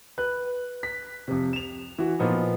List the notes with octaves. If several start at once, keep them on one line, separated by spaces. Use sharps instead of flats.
B4 F#6
B6
F2 C3
E7 F7
E3 F#4
A#2 F3 B3 D#4